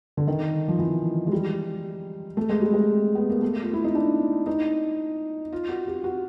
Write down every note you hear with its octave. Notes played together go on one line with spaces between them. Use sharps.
D3
D#3
F3
E3
G#3
G3
A3
G#3
G3
G#3
B3
A#3
A3
F4
E4
D#4
D4
D#4
F4
F#4
G4
F#4